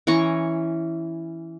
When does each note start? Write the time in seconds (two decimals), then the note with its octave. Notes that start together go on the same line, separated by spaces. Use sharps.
0.07 E3 C#4 A#5 C#6